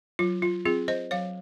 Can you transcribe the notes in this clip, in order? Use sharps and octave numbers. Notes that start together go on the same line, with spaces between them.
F#3 F4
F4
C4 F4 G#4
C5 D#5
F#3 C#5 F5